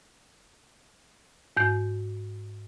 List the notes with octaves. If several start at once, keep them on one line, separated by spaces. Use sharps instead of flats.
G#2 G6